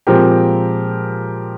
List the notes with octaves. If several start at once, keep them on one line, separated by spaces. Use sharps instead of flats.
A#2 F3 G#3 C4 G4 A#4